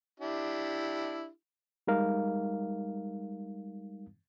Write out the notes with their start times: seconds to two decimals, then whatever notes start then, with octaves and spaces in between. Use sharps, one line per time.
0.20 D4 E4 G4
1.87 G3 G#3 D#4 A#4 F5